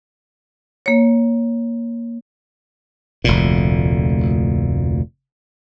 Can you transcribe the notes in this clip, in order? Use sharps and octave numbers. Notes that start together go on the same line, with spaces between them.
A#3 C#5
F1 D2 A#2